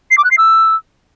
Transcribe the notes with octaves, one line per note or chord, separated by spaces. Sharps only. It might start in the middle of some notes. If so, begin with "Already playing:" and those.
C7
D6
F#6
C7
E6